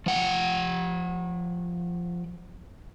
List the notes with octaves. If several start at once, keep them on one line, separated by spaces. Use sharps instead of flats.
F3 F#5 G5